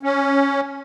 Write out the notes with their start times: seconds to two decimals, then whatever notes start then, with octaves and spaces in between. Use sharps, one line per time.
0.03 C#4